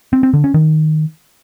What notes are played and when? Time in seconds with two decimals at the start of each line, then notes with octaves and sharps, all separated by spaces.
0.13 C4
0.23 C4
0.33 D3
0.44 C#4
0.54 D#3